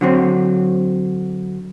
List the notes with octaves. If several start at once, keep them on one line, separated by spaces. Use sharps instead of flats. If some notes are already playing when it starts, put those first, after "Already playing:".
D3 F#3 C4